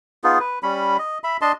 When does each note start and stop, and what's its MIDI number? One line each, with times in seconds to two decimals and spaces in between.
0.24 0.39 59
0.24 0.39 63
0.24 0.39 65
0.24 0.39 68
0.40 0.59 71
0.63 0.97 55
0.63 0.97 61
0.63 0.97 83
0.99 1.18 75
1.24 1.37 76
1.24 1.37 83
1.41 1.52 62
1.41 1.52 75
1.41 1.52 81
1.41 1.52 84